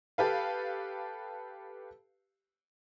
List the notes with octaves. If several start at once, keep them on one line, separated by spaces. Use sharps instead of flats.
G4 A4 B4 F5